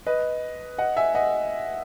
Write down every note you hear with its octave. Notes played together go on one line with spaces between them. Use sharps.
B4 D#5
D#5 F#5
E5 G#5
D#5 F#5